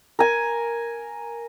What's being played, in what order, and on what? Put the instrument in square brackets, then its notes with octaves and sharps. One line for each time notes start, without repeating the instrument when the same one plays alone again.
[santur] A#4 G#5